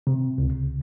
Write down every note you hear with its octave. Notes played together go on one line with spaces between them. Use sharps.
C3
C#2